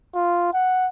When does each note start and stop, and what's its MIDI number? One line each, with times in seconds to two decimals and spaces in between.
0.15 0.53 65
0.53 0.89 78